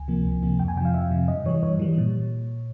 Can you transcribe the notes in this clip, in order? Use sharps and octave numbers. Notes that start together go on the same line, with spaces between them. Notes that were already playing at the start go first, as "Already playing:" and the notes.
Already playing: C#2 G#5
C3 F3 A#3
C#2
C3 F3 A#3
F2 G5
G#5
C3 F3 F5 G5
F2 E5
C3 F3
G2 D#5
E3 G3 C#5
G2 C#5
E3 G3
A#2